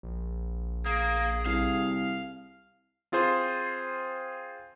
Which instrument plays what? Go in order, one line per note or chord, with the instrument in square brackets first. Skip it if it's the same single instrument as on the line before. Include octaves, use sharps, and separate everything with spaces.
[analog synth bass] A#1
[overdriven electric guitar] A#3 [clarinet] G#4
[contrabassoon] C2 [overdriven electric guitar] F5
[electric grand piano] C4 F4 G#4 C5 C6